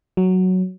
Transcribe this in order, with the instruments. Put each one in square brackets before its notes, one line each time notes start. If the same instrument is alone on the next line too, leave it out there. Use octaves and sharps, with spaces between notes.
[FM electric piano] F#3